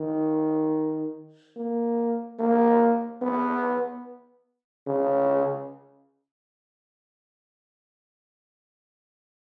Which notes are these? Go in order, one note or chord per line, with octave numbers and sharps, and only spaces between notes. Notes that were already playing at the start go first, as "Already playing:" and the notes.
Already playing: D#3
A#3
A#3
B3
C#3